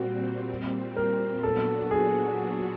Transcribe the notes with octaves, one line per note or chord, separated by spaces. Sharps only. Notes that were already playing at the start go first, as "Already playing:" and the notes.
Already playing: A#2 G3 C4 F#4
A#4
A#2 F#3 B3 D4 F#4 A4
G#4